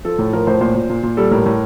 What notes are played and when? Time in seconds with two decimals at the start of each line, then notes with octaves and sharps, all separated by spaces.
0.05 F3 A4
0.18 A2
0.33 F3 A#4
0.47 A2 C5
0.61 A#2 C5
0.75 A#2
0.90 A#2
1.03 A#2
1.17 G3 A4
1.31 A2 A#4
1.46 A2